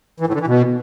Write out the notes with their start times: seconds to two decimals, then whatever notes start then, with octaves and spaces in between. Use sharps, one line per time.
0.20 E3
0.27 A2
0.34 D3
0.40 E3
0.47 B2